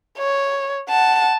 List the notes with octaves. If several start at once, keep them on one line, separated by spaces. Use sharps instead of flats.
C#5
F#5 A5